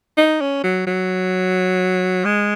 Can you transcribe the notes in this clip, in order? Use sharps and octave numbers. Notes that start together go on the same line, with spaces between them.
D#4
C#4
F#3
F#3
G#3